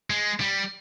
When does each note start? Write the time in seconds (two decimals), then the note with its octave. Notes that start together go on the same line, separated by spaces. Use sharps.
0.10 G#3
0.40 G3